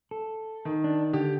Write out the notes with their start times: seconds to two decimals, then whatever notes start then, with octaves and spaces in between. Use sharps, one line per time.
0.11 A4
0.65 D#3
0.84 D4
1.13 D3 G4